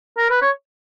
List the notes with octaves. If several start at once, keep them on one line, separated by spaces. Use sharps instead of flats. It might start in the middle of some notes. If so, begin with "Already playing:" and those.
A#4
B4
C#5